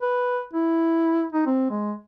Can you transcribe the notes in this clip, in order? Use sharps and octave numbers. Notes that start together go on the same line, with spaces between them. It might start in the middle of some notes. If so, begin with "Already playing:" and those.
B4
E4
D#4
C4
G#3